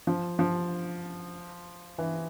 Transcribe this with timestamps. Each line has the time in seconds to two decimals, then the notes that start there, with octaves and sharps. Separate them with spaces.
0.07 F3
0.39 F3
1.98 E3